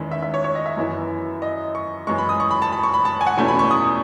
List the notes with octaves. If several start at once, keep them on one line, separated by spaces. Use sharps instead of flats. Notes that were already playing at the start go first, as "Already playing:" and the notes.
Already playing: E2 D#3 G#3 C#4 E4
E5
E5
C#5
C#5
D#5
E5
F#2 E3 B3 E4
D#5
C#6
F#2 E3 G#3 C#6
B5
D#6
C#6
B5
A5
B5
C#6
B5
A5
G#5
F#5
E2 B2 A3 C#4 E4 G#5
B5
C#6
D#6